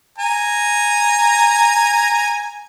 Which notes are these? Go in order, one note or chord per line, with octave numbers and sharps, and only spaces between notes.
G#5 A#5